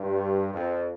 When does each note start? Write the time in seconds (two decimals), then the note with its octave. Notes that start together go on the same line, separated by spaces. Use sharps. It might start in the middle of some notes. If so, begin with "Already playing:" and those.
Already playing: G2
0.54 F2